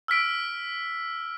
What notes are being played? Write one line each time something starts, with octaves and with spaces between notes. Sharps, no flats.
E6 F6 B6 D7